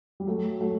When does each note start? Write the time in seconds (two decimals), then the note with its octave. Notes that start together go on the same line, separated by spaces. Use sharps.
0.20 G3
0.27 F#3 A3
0.60 F#3 A3